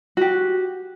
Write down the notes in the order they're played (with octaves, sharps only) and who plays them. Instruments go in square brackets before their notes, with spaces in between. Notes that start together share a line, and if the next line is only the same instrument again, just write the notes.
[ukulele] F#4 G4